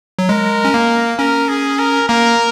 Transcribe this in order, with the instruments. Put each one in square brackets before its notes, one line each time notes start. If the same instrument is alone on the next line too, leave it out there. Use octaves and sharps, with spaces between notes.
[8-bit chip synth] F#3
[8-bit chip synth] G#3 [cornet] A#4
[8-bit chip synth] C#4
A#3
[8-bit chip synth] C#4 [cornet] A#4
[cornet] G#4
A#4
[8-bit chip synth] A#3 [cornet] A#4